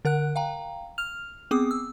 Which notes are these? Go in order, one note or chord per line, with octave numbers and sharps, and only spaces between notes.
D3 A#4 F#5 F#6
F5 G5 A#5
F6 F7
B3 C4 G#4 D6 D#6
E6